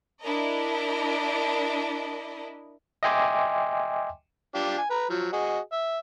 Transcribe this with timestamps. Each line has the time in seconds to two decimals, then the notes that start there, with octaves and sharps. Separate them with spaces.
0.21 D4 E4 A#4 D#5
3.03 D#5 E5 G5 G#5 C6 D6
4.55 D4 F4 G4
4.78 G#5
4.90 B4 A#5
5.10 F3 F#3
5.33 F#4 G#4 D#5
5.72 E5